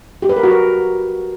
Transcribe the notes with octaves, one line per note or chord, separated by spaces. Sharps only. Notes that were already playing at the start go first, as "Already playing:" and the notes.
G4
B4
A#4
F#4
A#4